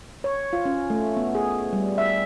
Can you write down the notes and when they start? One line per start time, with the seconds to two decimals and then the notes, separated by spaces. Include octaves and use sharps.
0.24 C#5
0.53 F4
0.65 C#4
0.90 A3
1.17 B3
1.35 G#4
1.73 G3
1.98 E5